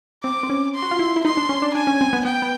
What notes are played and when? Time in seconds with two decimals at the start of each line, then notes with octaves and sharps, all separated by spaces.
0.23 C4 D6
0.43 C4
0.50 C#4
0.75 C6
0.82 F#4
0.91 F4
0.99 E4
1.16 E4
1.25 D#4 C6
1.37 D4
1.49 C#4
1.62 D4
1.75 D4 G#5
1.87 C#4
2.01 C4
2.13 B3
2.25 B3 G5
2.42 B3